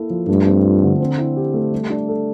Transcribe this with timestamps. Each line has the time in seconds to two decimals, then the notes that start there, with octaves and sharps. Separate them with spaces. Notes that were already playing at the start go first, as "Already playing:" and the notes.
Already playing: A#3 E4 A4
0.10 F3
0.28 G2 A3
0.46 C4
0.65 F4
0.82 D3
1.00 C4
1.18 E4
1.36 G4
1.54 A3
1.72 G3
1.90 D4
2.08 A4